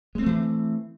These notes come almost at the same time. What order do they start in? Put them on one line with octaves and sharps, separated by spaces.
G#3 C4 A3 E3